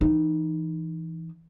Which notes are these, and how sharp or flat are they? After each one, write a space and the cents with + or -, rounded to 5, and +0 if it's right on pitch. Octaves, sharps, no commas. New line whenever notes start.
E3 +0 D#4 -10